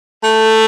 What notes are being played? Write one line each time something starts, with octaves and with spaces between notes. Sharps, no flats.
A3